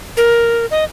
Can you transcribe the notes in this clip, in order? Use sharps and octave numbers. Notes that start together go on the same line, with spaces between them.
A#4
D#5